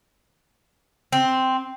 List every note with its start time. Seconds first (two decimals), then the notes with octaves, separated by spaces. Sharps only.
1.12 C4